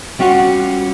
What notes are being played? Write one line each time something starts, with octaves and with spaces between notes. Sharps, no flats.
G3 C#4 F4 F#4 F#5